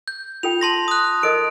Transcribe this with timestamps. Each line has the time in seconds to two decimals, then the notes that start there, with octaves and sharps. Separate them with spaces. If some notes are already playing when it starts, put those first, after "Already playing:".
0.08 G6
0.43 F4 A4 G5 F7
0.61 A5 C6 A#6
0.88 D#6 F#6
1.23 A4 A#4 D#5 D7